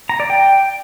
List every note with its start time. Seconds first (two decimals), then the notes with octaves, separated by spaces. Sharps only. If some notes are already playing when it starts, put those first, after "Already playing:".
0.09 A#5
0.20 D5
0.30 G5